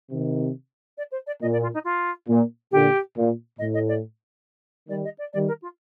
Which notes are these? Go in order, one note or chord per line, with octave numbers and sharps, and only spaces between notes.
C3 D#3
D5
C5
D5
A#2 D#5
D5
F4
D#4
F4
A#2
A#2 D3 G4
A#2
A2 D#5
D#5
D5
D#3 G3 D5
D#5
D5
D#3 G3 D5
A#4
F4